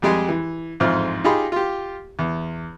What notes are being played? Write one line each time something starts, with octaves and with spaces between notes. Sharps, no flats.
F2 G3 G#3 G4 G#4 G#5
E3
A1 F2 G#2 F4 C5 F6
D#4 F4 G4 G#4 B5
F4 G4
E2